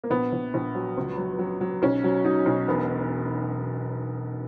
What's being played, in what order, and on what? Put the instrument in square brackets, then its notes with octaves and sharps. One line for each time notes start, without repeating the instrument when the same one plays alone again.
[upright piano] A#3
A#1 B3
A#1
A#1
F#3
C#2
F#3
F#3
F#3
B1 C#4
F#3
F#3 D#4
B1
E1 B3